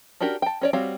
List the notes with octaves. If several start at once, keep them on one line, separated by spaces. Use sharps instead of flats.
C#4 D4 F#4 G4 A#4
G5 A5
C#4 C#5 D5
G3 C4 F#4 C#5 F5